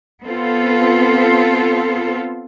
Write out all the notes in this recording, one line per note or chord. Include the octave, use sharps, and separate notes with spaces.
B3 C4 F4 A4